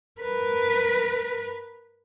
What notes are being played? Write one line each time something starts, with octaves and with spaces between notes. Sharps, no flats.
A#4 B4